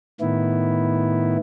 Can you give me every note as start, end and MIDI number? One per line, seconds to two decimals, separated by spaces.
0.21 1.37 45
0.21 1.37 51
0.21 1.37 59
0.21 1.37 64